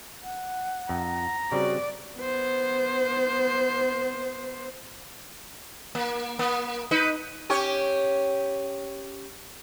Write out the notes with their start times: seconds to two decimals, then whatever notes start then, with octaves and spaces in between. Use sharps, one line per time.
0.23 F#5
0.89 F2 A#5
1.52 C#3 G3 C4 F#4 D5
2.16 B3 C5
5.95 A#3
6.39 A#3
6.91 D#4 B4
7.50 C#4 G4 C#5